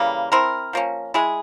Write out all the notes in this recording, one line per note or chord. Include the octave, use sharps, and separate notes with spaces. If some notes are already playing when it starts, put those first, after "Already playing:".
Already playing: C#3 E3 G3 A#3
C4 E4 A#4
F3 A#3 C#4
G#3 E4 G#4